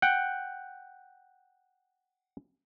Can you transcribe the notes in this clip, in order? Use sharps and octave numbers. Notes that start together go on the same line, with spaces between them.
F#5 G5